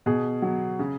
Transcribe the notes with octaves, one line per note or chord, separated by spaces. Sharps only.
B2 G#4
F#3
C#3